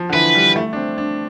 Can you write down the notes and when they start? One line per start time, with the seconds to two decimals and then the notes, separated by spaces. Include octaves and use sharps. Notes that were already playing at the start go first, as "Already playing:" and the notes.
Already playing: F3
0.09 D3
0.13 E3 B4
0.35 G3
0.56 A3
0.73 D4
0.76 C4
0.98 D4